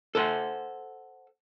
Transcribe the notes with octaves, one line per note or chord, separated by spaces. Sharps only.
A4 C5 F#5